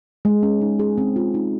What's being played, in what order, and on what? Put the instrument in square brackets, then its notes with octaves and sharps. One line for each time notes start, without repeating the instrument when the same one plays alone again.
[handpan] G#3
C#4
D#4
G#4
C4
F4
D#4